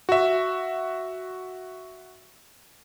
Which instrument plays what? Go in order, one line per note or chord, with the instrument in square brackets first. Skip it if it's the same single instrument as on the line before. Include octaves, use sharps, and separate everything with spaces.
[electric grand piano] F#4 E5